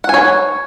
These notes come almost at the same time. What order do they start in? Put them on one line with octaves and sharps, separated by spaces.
F#5 G#5 C#5